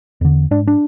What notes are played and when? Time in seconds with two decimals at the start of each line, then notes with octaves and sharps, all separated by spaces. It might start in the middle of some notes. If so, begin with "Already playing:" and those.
0.21 E2 D3
0.51 G#2 D4
0.67 D4